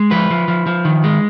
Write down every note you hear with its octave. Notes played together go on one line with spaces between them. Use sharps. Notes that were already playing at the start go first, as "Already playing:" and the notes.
Already playing: G#3
F3 B4
F3
F3
F3
D#3
G#3